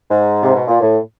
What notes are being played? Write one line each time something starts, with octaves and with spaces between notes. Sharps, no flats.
G#2
C3
B2
A#2
A2